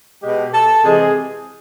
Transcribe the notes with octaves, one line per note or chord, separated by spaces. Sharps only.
B2 G#3 G4
A4
C3 E3 G#3 G#4